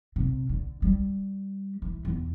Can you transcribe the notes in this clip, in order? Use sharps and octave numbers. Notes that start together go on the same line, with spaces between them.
C3
D3
G3
E3
E2